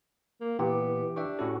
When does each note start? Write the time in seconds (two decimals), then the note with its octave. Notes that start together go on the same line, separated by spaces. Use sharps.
0.40 A#3
0.59 A#2 E3 B3 G4
1.16 D4 E5 G5 C#6
1.39 A2 C#4 E4 F#4 A4